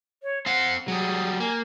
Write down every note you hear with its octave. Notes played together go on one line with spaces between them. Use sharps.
C#5
C4 F5 F#5
F#3 G3 G#4
A#3 G#5